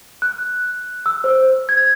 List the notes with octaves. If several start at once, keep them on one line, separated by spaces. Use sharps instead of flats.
F#6
E6
C5
G#6